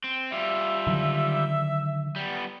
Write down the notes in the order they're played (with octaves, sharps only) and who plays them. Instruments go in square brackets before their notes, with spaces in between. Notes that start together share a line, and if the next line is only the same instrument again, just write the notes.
[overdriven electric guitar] C4
[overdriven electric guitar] G3 F4 [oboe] E5
[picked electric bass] D3 D#3 F#3
[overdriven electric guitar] G3 B3